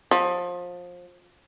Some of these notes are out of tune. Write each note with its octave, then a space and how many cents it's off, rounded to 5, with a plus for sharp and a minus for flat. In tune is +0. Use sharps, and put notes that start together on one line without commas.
F3 +25